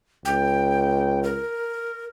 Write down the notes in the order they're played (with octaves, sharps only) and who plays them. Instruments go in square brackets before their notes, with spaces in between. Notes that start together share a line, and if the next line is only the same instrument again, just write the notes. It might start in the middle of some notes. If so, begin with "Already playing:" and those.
[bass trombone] C#2 [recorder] G5
[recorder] A#4